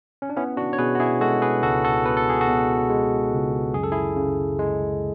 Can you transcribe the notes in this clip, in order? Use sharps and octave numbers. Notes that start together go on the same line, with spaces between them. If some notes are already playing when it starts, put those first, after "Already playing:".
C#4
D4
B3 C#4 E4
D4 F#4
C#5
B2 G#4 B4
F#4
E4 G#4
G#3 F#4 A4
G#4 B4
C#2 F#4 A4
F#4 A4
B3 B4
A4
G#4
F#4 A4
B2
G#3
C#2
F#2 G#4
A4
E4 G#4
C#3
G#3